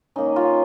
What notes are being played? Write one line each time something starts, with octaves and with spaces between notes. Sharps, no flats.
D#3 A#3 C#4 D#4
F4